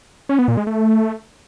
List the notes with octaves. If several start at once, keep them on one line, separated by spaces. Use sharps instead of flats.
C#4
B3
A#2
G#3
A3